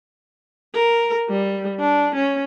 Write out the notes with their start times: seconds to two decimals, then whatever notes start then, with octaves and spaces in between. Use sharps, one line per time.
0.75 A#4
1.30 G3
1.80 D4
2.16 C#4